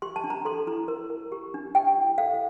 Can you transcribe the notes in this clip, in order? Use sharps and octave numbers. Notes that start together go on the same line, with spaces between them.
G4 C6
A5
D4
A#5
A4 C6
E4 A#5
A#4
A#4
G4
D4
G4 G5
E4
A4 F5